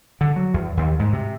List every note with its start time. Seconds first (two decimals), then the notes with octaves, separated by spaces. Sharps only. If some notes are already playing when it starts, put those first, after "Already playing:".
0.21 D3
0.36 F#3
0.54 E2
0.77 D#2
0.99 G#2
1.13 C3